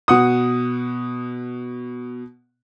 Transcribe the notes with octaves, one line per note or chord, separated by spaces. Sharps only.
B2 F#5 D#6